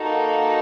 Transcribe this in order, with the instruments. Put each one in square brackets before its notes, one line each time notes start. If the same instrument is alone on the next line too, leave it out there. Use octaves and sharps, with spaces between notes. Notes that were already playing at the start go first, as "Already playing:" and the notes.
Already playing: [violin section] A#3 D#4 F#4 A4